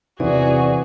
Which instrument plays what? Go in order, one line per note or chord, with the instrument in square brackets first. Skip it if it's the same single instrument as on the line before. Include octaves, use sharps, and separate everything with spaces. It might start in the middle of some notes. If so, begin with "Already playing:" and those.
[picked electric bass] E2 C3 [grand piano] E3 [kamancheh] F#4 G#4 [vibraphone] D5